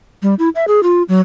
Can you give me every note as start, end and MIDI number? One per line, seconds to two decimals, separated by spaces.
0.22 0.35 55
0.39 0.49 64
0.55 0.65 76
0.68 0.83 68
0.83 1.03 65
1.09 1.21 54